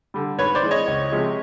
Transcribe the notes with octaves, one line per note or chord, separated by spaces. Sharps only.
D3 G3
G#2 B4 C#5
C5 D5
E3 G#3
C#5 D#5
C#2
C3 F3 G#3